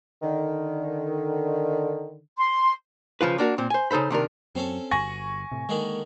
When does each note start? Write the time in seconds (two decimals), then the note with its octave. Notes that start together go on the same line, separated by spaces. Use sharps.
0.23 D3 D#3
2.38 C6
3.21 C#3 F3 F4 B4
3.38 A#3 D4 F#4 A#4
3.58 A#2 C4
3.70 C5 G#5
3.91 C#3 D#4 A4 C5 B5
4.10 C3 D#3 D4 A#4
4.55 F#2 C4 C#4 A4
4.91 G1 F#4 G#5 C#6 A#6
5.51 A2 C3
5.69 D3 D#3 G#3 A#3 D4